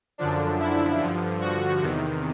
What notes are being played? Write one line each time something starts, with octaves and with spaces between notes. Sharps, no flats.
F#2 D3 F3 D4
E4
G2 D3 F3
F#4
E2 C3 D#3